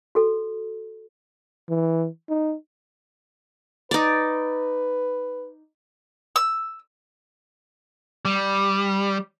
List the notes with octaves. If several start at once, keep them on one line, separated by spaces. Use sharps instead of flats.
F#4 A4
E3
D#4
D#4 B4 D5
E6
G3